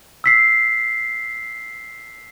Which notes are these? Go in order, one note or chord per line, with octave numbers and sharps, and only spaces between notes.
E6 B6 C7